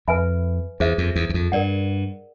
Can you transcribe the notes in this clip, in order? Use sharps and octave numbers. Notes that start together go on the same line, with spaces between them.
F2 B4 E5 G#5 B5
E2 G#4 C5 E5
F2
E2
E2
F2
G2 A#4 D5 F#5